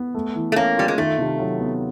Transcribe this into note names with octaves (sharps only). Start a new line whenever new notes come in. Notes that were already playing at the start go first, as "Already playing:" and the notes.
Already playing: B3
A3
E3
A3
A#3 C#4
G3 F4
G#3
D#3 A3
C3
F#3
B3